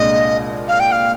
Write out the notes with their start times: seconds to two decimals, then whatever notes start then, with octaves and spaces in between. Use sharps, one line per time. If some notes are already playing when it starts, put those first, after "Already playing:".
Already playing: C2 A#2 G#3 D4 D#5
0.68 F5
0.80 G5
0.92 F5